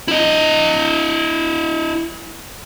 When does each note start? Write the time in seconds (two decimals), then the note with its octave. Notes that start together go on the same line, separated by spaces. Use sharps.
0.08 E4 D#5